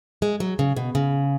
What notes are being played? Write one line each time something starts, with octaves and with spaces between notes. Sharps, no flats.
G#3
F#3
C#3
B2
C#3